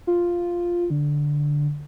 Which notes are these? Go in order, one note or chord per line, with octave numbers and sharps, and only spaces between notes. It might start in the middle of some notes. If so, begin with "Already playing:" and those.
F4
D3